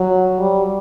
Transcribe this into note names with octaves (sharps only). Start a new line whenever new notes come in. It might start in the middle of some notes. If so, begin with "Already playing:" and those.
Already playing: F#3
G3